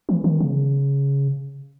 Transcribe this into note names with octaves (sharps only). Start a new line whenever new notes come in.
E3
D#3
C#3